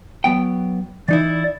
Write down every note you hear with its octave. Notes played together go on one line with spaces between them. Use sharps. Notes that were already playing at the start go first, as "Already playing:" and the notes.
F#3 B3 G5
E3 D#4 E4 D5